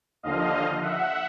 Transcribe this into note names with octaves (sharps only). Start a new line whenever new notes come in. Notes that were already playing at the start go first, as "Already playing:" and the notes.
D#2 D3 F3 D#5 F5
E5 F#5